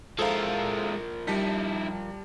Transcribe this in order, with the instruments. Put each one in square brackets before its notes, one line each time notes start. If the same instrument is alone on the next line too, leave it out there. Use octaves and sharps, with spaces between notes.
[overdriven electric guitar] F3 A#4 [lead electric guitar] G#3 E4 [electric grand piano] A4 C5 F5
[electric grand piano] G3 A5 B6 [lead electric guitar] D#4 E4